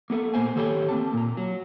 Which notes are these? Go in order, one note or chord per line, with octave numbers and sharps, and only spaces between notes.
A#3 B3 A4 E5
A#2 A#3 C5 G#5
D#3 G4 A4 C#5 F#5 G5
A#3 C4 A5
A#2 A#5
F#3